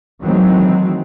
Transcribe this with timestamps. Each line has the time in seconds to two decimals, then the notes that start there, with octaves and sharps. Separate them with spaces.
0.22 D#3 E3 F#3 G#3 A3 C4